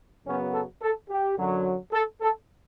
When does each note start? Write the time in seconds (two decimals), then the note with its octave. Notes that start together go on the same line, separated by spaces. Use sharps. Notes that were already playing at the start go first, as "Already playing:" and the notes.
0.25 F#2 C#3 F#3 B3 C#4
0.53 A4
0.82 A4
1.09 G4
1.37 F#2 D3 F#3
1.93 A4
2.21 A4